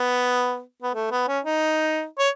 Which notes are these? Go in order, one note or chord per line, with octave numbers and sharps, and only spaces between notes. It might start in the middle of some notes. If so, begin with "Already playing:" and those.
Already playing: B3
B3
A3
B3
C#4
D#4
C#5